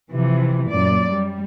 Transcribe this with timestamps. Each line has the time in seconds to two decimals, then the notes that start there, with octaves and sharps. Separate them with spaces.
0.12 C3 E3 F3
0.70 F#2 A#2 D5
1.13 G3